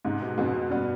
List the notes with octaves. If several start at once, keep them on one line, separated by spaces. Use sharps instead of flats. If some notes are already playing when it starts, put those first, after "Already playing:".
G#2 C3 D#4
B2
F2 G#2 B2
B2
G2 B3